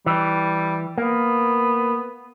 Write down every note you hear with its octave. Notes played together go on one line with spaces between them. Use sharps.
E3 G3
A#3 B3